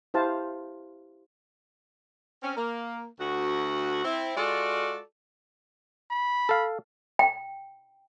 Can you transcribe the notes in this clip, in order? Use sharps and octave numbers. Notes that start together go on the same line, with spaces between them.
E4 G4 C5 F5 A5
C4 C#4
A#3
D2 F#4
C4 E4
G#3 F4 F#4 A4 D5
B5
A4 F5
G5